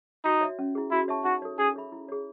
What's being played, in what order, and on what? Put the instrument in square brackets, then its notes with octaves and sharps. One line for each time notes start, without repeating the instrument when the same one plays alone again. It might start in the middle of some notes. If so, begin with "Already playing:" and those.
[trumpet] D#4 [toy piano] F#4
[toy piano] C#5 E5
C#4
E4 G#4
[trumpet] E4 [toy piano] F#4
[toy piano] C#5 E5 A5 C#6
[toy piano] D#4 [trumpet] F#4
[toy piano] A4 C#5
[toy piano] C#4 [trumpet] G#4
[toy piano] G#4 C#5 E5 B5
E4
G#4 C#5